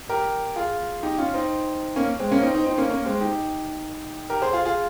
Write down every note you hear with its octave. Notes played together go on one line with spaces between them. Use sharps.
G4 A#4
F4 G#4
D#4 G4
C#4 F4
C4 D#4
A#3 C#4
G#3 C4
A#3 C#4
C4 D#4
C4 D#4
C4 D#4
A#3 C#4
A#3 C#4
G#3 C4
D#4 G4
G4 A#4
G#4 C5
F4 G#4
F4 G#4